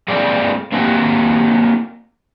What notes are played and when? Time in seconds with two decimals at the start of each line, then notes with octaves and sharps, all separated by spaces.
0.08 G#3 A#3 C4 D5
0.72 A#3 C4 D#4 F#4 G4